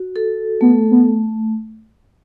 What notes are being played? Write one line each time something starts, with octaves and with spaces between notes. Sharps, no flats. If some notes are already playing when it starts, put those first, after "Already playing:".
Already playing: F#4
A4
A3 B3
B3